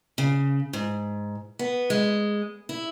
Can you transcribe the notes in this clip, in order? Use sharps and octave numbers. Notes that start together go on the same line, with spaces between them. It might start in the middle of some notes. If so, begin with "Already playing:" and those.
C#3
G#2
B3
G#3
E4